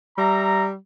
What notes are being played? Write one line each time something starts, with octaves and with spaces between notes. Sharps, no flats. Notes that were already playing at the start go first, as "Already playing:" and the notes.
G3 E5 A#5